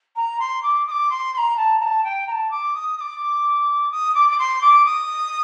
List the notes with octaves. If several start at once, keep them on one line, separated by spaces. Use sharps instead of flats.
A#5
C6
D6
D#6
D6
C6
C6
A#5
A5
A#5
A5
G5
A#5
A5
D6
D#6
D#6
D6
D#6
D6
D6
C6
D6
D#6